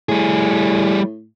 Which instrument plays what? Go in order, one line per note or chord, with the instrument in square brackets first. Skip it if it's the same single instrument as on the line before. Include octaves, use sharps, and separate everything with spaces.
[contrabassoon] A2 [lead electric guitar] G3 G#4